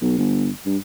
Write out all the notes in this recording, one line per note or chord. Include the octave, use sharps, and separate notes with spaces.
B1
G1
G2